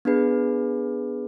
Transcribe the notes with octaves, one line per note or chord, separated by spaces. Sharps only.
B3 D4 G#4 B4